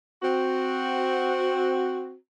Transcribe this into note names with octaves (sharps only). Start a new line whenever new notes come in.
C4 F#4